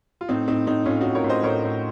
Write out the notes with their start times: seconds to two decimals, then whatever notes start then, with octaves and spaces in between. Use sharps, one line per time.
0.21 F4
0.29 A2 C4 D#4
0.48 A2 C4 D#4
0.66 A2 C4 D#4
0.86 A2 C#4 F4
1.01 A2 D#4 F#4
1.15 A#4 C#5
1.24 A2
1.29 C5 D#5
1.43 A2 A#4 C#5
1.63 A2